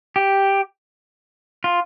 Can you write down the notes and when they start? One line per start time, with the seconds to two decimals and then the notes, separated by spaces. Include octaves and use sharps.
0.16 G4
1.64 F4